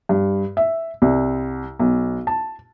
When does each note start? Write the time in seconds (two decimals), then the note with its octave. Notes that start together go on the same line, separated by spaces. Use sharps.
0.09 G2
0.57 E5
1.02 C2
1.79 B1
2.27 A5